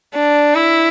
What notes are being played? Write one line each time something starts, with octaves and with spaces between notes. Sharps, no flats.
D4
E4